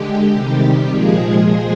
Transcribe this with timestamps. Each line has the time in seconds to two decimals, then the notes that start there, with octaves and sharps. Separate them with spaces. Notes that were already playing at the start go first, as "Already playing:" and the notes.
Already playing: D3 G#3 G4
0.33 C3 D#3 G3
0.91 A#2 F3 G#3 G#4